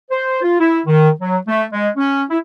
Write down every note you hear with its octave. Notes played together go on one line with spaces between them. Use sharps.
C5
F4
E4
D#3
F#3
A3
G#3
C#4
E4